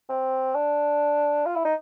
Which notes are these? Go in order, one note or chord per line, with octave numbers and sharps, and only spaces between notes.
C4
D4
F4
E4
D#4